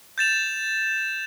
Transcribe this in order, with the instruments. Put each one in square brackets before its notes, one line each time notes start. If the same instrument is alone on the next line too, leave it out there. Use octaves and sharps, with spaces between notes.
[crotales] G6 A6 E7 F7